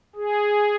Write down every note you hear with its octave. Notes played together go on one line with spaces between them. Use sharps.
G#4